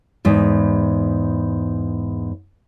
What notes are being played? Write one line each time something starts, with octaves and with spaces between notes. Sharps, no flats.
E2 G#2